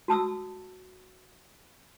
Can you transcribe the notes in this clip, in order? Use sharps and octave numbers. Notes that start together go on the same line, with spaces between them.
F#4 A5 D#6 E6